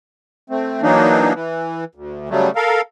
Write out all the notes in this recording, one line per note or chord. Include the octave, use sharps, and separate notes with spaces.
A3 C4
E3 F#3 A#3 D4 D#4
E3
D2
C#3 F#3 G3 A3
A4 A#4 F5